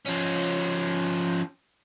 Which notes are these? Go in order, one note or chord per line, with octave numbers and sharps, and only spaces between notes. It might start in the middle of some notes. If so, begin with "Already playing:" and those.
F3 C#4